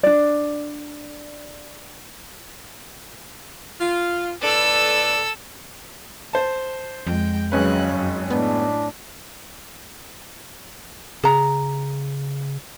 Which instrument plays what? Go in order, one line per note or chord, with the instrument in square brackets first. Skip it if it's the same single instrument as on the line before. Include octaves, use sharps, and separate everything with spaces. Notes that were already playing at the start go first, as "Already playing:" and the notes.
[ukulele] D4 D5
[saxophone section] F4
[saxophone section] A2 B4 D5 [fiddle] A4 E6
[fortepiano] C5 A5
[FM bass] F2 [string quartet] G#3 G5
[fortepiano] G#1 C#4 B4 [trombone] C#3 [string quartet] F#3 F#6
[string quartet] F#2
[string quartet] A2 [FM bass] B3 [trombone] D4
[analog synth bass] C#3 [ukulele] G#4 A#5